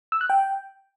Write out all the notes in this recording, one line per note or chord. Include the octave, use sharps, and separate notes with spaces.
E6
F#6
G5